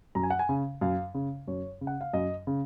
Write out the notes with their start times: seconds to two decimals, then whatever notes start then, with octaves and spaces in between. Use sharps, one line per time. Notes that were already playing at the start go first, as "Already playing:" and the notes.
0.15 F#2 A#5
0.23 G#5
0.30 F#5
0.39 G#5
0.49 C#3
0.81 F#2 F5
1.15 C#3
1.48 F#2 C#5
1.81 C#3
1.87 F#5
2.01 F5
2.13 F#2 D#5
2.47 C#3